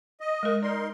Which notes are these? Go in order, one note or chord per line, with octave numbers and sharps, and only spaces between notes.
D#5
G#3 A#4
D#4 A#4 D5 C6